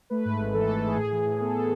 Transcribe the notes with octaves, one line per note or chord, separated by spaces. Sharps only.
A3 B4
G#2
G#1
E3 A4
A3
A4
G#2 G#4
A2
E3
A2
B3 A4
A2